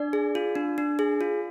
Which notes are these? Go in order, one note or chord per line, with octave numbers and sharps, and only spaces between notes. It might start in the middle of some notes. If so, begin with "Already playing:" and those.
Already playing: D4 D5
G#4
F4
D4
D4
G#4
F4